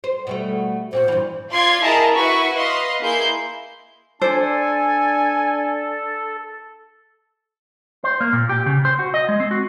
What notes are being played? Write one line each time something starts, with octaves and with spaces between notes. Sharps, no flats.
C5
B2 G3 A3
A#2 C4 F#4 C5
G2 E3
F4 D5 F5 C6 G#6
E4 G#4 A#4 D#5 A5 A#5
E4 F#4 B4 C#6
B4 D#5 F5 C6
A#3 E4 G#4 C6 G6
D4 A4 C5 D5 G#5
C5
A#3
A#2
G4
C#3
C5
F#4
D#5
G#3
C4
F#4